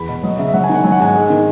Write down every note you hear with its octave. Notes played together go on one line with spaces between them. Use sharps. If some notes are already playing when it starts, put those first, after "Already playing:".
Already playing: E2 B5
B2
F#3 D#5
C#3 E5
E5
F#3 F#5
G#5
D#3 F#5
F#3 G#5
F#5
G#2 G#5
G#3
D#3